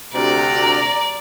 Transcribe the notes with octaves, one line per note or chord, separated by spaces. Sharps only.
D2 C3 D5 A#5